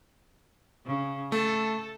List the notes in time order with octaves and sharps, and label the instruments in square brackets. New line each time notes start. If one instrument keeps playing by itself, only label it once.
[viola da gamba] C#3
[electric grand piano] A3 [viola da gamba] A4